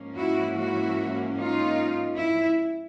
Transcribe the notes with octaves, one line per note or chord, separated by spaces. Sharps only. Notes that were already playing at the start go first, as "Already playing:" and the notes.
Already playing: G#2 F3 A#3 C#4
E4 F#4
E4 F#4
D#4 F4
E4